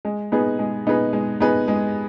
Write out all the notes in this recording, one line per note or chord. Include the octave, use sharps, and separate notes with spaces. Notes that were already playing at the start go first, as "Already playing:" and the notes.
G#3
B3 D#4 G#4 B4
G#3
B3 D#4 G#4 B4
G#3
B3 D#4 G#4 B4
G#3